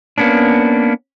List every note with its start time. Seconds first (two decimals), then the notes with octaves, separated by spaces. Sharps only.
0.18 A#3 B3 C#4 D4